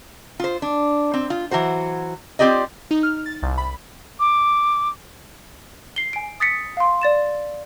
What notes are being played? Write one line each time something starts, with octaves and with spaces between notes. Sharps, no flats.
F4 C5
D4
C4
F4
E3 F#3 F#4 C5
C4 F4 G4 D5 D#5
D#4
F6
A6
C2
B5
D6
C7 G7
G#5 D7
D#6 A6 B6 C#7
F5 C6
D5 A6 E7